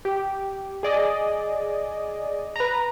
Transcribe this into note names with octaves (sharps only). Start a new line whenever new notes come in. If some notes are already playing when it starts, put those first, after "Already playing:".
G4
G#4 D5 D#5
B4 A#5